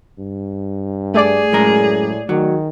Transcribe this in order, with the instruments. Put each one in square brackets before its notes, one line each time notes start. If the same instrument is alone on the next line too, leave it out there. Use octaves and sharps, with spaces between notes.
[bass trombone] G2
[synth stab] A3 D5 [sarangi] G#4
[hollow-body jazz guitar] F#2 G#3 A#4 [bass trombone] A2
[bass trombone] D#3 [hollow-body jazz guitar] F#3